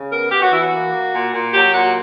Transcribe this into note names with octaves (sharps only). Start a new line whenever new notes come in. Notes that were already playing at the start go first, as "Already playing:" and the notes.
Already playing: C#3
B3 A#4
B3 G4
F#4
E3 E4
F#4
A#3
A#3
A#2
A#2
F#3 G4
A#2 F#4